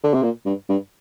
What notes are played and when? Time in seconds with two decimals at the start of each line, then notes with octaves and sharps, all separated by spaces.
0.04 D3
0.14 C3
0.23 A#2
0.46 G2
0.69 G2